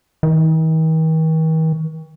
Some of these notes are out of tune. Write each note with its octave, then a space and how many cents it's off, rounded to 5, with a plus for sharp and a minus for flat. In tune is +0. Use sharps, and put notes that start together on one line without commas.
D#3 +45